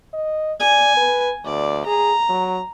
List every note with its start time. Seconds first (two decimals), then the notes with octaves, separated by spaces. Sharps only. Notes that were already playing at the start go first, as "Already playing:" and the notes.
0.13 D#5
0.60 D5 G#5
0.96 B4
1.45 D2 D5
1.86 G#4 A#5
2.29 F#3